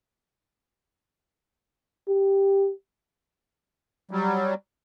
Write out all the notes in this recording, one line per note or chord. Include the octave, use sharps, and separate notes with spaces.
G4
F#3 G3